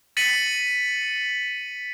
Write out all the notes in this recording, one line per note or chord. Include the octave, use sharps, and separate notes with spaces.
A6 B6 C#7 D#7 F#7